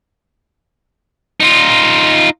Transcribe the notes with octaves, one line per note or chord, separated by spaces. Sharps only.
D#4 F4